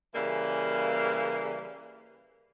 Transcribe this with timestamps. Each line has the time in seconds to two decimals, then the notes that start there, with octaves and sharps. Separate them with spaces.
0.15 C#3 E3 G3 A#3